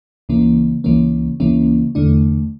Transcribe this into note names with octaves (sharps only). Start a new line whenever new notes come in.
C#2 C#3 E3 A#3 C#4
C#2 C#3 E3 A#3 C#4
C#2 C#3 E3 A#3 C#4
E2 D3 A3 D4